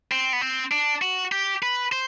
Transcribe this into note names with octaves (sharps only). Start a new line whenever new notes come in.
C4
B3
C4
D4
F#4
G4
B4
C5